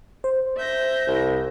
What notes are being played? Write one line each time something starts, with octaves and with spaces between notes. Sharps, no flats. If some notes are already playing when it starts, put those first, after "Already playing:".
C5
E5 G6 A#6
C2